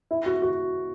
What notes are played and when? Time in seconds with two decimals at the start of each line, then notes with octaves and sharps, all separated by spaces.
0.11 E4
0.26 F#4
0.42 F#4